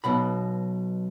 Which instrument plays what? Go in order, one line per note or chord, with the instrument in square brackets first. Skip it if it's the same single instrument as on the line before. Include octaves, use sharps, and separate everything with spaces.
[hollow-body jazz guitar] B1 B2 B5